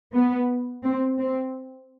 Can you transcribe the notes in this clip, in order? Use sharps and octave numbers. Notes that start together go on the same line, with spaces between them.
B3
C4
C4